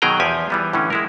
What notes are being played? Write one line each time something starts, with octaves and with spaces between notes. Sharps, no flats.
B2 D#3 F#3 G#4 G5 A#5
E2 F3 G4 G#5
E3 G3 B3
A2 D3 E3 C#4
G#3 E4 A#4